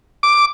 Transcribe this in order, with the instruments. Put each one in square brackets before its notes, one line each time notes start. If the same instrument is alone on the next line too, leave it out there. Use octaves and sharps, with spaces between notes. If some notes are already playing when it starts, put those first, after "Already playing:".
[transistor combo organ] D6